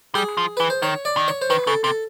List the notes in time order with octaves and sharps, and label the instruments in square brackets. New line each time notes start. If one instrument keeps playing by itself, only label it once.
[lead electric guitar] G3 [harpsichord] G#4
[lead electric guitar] F3
[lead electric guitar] E3 [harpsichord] B4
[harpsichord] C5
[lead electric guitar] D#3 [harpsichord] C#5
[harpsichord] D5
[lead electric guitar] D#3
[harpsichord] C#5
C5
[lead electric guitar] D#3 [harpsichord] B4
[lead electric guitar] C#3 [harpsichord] A4
[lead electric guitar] C3 [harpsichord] A4